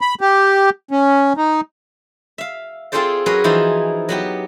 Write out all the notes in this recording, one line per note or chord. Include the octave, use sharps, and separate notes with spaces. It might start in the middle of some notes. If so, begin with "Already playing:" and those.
B5
G4
C#4
D#4
E5 F5
C4 F4 G#4 A4 C5 D5
F#3 C#4 G#4 A#4 B4
E3 F3 D#4 E4 C5
F#3 B3 G4